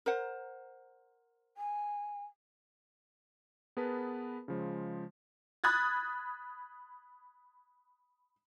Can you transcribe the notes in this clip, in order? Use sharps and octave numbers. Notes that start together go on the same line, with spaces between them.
A#4 C5 F#5
G#5
B3 G#4 A#4 B4 A5 B5
C#3 F3 G#3
B5 D#6 F#6 G#6 A6